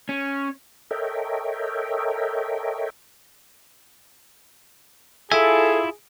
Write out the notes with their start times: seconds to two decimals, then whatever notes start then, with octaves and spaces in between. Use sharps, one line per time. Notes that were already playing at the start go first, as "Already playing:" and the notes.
0.09 C#4
0.91 A4 A#4 C#5 D#5 E5 G5
5.32 E4 F4 G#4 A4 E5 G#5